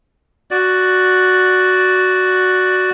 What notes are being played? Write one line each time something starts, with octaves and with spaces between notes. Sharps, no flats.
F#4 D5